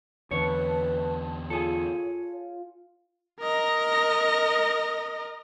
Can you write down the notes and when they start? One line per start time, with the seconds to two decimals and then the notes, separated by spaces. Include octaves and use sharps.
0.31 E2 D3 B4 C#5 A5
1.50 F4 G#4 A4 C#5
3.41 A#4 D#5